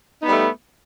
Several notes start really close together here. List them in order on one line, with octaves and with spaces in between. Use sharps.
D#4 B3 G3 A3